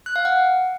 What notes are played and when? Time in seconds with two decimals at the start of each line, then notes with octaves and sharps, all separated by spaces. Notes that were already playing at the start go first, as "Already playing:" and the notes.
0.06 F#6
0.16 F5
0.25 F#5